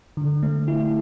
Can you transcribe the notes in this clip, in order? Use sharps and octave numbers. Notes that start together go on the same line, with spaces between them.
D3
A3
E4